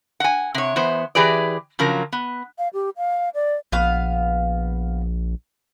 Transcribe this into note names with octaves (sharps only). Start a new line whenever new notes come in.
F#5 G#5
C3 C#5
E2 B3 C5
E3 G4 G#4 B4 D5
C#3 F3 F#3 A#4
B3
F5
G4
F5
D5
A#1 B3 F5